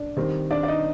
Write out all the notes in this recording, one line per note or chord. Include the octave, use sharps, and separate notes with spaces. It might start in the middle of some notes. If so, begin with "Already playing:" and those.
Already playing: D4 D5
D#3 G3 C4
D4 D5
D5
D#4 D#5